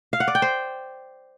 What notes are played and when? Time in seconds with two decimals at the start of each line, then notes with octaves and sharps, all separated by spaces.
0.13 F5
0.20 F#5
0.28 D5
0.35 G5
0.42 C5